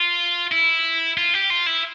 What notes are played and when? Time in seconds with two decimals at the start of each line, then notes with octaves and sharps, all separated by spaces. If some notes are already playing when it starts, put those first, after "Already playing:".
Already playing: F4
0.52 E4
1.17 F4
1.34 G4
1.50 F4
1.67 E4